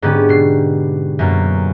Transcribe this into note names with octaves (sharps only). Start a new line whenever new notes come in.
G#2 D3 B3 C#4 G4
B2 C7
F#2 B2 A#3